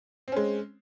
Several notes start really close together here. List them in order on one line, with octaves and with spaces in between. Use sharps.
C4 C#4 G#3